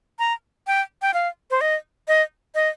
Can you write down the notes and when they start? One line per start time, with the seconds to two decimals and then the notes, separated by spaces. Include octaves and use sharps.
0.19 A#5
0.67 G5
1.02 G5
1.14 F5
1.51 C5
1.61 D#5
2.08 D#5
2.55 D#5